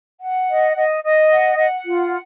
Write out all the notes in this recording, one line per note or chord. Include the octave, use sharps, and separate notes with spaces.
F#5
D#5
D#5
D#5
F#5
F#5
F4